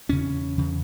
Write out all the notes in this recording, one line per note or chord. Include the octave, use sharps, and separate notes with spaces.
E2 C#3 C#4
E2 C#3